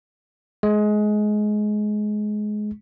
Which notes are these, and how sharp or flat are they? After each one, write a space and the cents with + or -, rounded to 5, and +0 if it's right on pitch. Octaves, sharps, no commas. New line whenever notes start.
G#3 +20